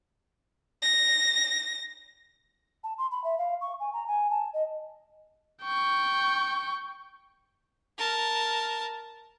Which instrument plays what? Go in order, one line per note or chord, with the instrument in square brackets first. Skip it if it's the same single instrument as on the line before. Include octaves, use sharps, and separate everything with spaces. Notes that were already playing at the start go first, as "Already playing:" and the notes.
[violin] A#6
[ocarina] A5
C6
B5
E5
F5
C#6
G#5
A#5
G#5
A5
D#5
[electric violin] G5 C#6
[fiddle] A#4 A5